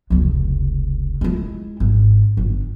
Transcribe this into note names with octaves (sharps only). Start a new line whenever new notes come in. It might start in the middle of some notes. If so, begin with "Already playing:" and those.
F1 C#2
G#3 E4
G#1
G1